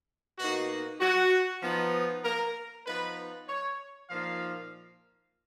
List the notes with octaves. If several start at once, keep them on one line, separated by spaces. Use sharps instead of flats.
B2 A#3 D#4 F#4
F#4
F3 B3 D#4
A#4
F3 B3 D#4 B4
C#5
A#2 F3 A#3 D#4 F5